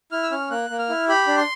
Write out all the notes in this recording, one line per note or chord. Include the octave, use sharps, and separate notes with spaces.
E4 F6
E6
C#4 F6
A#3 F#6
A#3
F6
E4
G4 B5
D4
C6